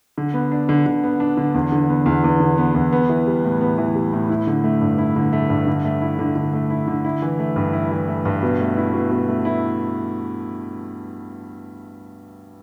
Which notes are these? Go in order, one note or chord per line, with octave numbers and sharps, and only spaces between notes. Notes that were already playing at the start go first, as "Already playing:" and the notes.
D3
B3
D4
D3
D3
B3
D4
D3
E2
D3
B3
E2
E2
D3
B3
E2
B3
E3
G3
A2
B3
E3
G3
A2
E4
D3
A3
G2
E4
D3
A3
G2
D3
A3
E4
D3
D3
A3
E4
D3
E4
E3
A3
G2
E4
E3
A3
G2
B2
A3
E4
B2
B2
A3
E4